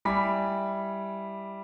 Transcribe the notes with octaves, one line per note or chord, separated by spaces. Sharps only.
G3 E4 G#5 B5 D6 B6